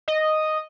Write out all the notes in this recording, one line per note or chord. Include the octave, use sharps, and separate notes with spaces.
D#5